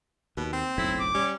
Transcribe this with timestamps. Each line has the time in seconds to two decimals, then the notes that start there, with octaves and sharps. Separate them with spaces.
0.37 D#2 B2
0.53 C4
0.78 F#1 B1 A2 E4
0.99 D6
1.15 G3 C#4